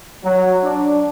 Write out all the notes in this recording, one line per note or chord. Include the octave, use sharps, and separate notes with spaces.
F#3
D4